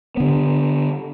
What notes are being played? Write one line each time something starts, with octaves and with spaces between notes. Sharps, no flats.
D3 B3